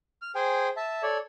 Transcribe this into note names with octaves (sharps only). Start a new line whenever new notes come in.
F6
G#4 C5 G5 G#5
E5 A5
A4 C#5 D5